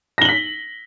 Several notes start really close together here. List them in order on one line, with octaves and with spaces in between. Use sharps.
A#6 G7 F#7 B6